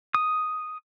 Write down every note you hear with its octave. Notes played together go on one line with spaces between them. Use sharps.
D#6